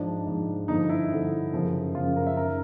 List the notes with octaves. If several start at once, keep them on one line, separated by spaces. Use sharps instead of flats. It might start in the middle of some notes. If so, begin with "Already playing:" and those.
Already playing: G#2 F3 D4
G#2 F3
G2 D3 F3 D#4
E4
G2 D3 F3
F#2 C#3 F3
F#2 C#3 F3 F4
A#4
E5
F#2 D#3 A#4